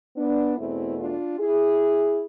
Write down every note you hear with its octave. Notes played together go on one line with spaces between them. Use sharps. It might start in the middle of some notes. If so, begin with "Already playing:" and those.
B3 D4
E2 B2 A3 C4 E4
D4 F4
E4 G#4